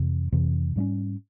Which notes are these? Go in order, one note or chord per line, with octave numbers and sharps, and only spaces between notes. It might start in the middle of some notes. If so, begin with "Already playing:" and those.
Already playing: F2 C3 E3
F2 C3 E3
G#2 G3 A#3 C#4